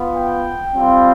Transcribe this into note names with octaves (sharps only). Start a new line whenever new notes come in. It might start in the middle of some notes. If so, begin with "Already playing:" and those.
Already playing: B3 F4
G5
G3 C4 F4